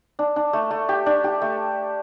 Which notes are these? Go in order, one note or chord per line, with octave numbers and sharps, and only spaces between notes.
D4
D4
A3
A3
G4
D4
G4
A3